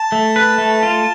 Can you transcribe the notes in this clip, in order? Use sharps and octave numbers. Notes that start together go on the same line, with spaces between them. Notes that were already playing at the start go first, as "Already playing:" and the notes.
Already playing: A5
A3
B4
A3
F4